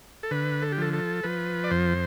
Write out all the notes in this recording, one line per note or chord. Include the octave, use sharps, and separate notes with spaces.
A4
D3 B4
A4
G4
F3 A4
A4
F3 B4
D5
F2 C5